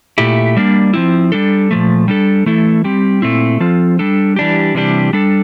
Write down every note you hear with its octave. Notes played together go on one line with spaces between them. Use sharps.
A#2 A3 E4 G4
G3 A#3 D4
F3 C4 E4
G3 D4 A4
A#2 F3 A3
G3 D4 A4
E3 A3 E4 A4
G3 C4 G4
A#2 A3 C4 E4
F3 C4 F4 A4
G3 D4 A4
E3 G3 D4 G4
C3 E3 G3 D4 G4
G3 D4 A4